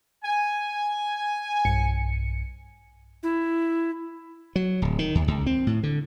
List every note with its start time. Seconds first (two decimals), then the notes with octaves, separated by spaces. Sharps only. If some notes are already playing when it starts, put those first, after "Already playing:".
0.24 G#5
1.65 B1 G2 C#7
3.23 E4
4.56 F#3
4.82 D1
4.99 D#3
5.15 D#2
5.28 C#2
5.46 C4
5.67 A2
5.83 D3